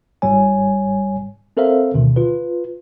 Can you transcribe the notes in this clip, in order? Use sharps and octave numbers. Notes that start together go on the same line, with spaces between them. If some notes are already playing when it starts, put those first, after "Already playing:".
G1 G#2 G3 C#5 G#5
C4 A4 A#4 C5 E5 F5
D2 B2 D3 D#3
F4 B4